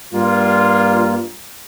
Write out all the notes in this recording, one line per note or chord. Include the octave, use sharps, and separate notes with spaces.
G2 G3 A#3 F4